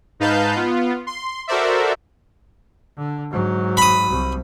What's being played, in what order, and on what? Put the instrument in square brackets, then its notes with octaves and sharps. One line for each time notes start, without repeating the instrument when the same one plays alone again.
[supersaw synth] G#2 D#4 B4 F5 A5 G6
B3 F4
C6
F#4 A4 A#4 C5 D5 E5
[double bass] D3
G#2 F#3
[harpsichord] B5 D#6
[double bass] C2